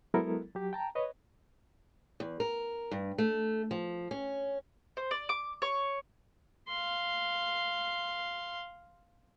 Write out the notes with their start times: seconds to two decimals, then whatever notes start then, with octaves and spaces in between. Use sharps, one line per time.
0.14 F#3 G#3 B3 E4 A4 A#4
0.55 F#3 G4
0.73 G5 A5 A#5
0.95 B4 C#5 D#5
2.20 E2
2.40 A#4
2.91 G2
3.18 A3
3.71 F3
4.11 C#4
4.97 C5
5.11 D5
5.29 D6
5.62 C#5
6.69 F5 C6